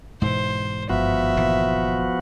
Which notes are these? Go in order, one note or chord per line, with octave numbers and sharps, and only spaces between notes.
G#2 B2 E3 C5
G1 D#3 F3 B3 F#4 E5
A#2 E3